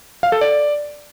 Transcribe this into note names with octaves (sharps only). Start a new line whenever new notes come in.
F5
A4
D5